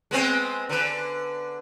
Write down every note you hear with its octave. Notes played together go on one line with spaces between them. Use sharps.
G#3 B3 C4
D3 B4